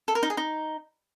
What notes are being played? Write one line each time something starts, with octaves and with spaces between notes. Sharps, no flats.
A4
A#4
D#4
G#4
D#4